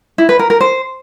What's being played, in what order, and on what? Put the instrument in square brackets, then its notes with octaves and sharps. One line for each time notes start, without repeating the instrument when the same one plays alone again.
[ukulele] E4
B4
A#4
A#4
C5